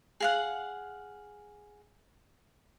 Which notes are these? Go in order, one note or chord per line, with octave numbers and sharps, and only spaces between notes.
G#4 F5 F#5